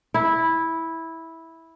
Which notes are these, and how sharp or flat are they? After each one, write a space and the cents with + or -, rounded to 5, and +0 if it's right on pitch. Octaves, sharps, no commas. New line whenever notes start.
E4 -10